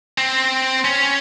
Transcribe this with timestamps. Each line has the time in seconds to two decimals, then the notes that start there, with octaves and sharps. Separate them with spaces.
0.18 C4
0.85 C#4